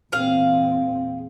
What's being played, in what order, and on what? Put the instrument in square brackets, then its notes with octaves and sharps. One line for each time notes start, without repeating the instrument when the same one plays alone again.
[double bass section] E2 A#2 C4 [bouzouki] G#4 F5